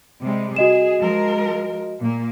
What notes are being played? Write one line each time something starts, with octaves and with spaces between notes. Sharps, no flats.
C3 G3 G#3
F#4 G#4 D#5 E7
F3 G#3 A#4
A#2 A#3